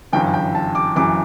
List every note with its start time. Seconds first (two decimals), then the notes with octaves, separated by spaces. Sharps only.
0.12 G1 F#2 E3 G5
0.34 G5
0.55 A5
0.75 D6
0.96 F#2 E3 D6